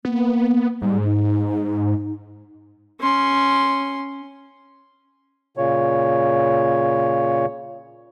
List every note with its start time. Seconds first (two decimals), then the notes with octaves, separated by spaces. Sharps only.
0.05 A#3 B3
0.82 G#2 G3
1.05 D#4
3.00 C#4 C6
5.57 A#2 C#3 C#5